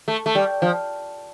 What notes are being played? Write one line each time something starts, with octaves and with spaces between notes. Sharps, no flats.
A3
A3
G3
F3